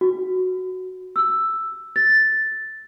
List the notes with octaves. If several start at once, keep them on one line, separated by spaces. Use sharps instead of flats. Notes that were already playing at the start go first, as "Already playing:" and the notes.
F#4
E6
A6